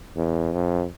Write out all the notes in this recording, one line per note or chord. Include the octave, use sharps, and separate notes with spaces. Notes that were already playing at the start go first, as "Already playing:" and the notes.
E2
F2